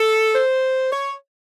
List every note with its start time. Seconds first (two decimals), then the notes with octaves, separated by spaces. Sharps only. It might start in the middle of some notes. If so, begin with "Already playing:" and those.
Already playing: A4
0.35 C5
0.93 C#5